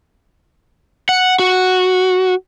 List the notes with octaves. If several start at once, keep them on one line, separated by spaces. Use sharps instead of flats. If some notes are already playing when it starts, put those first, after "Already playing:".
F#5
F#4